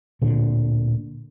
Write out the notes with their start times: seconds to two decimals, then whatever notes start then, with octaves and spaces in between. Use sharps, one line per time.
0.21 D1 A#2 D3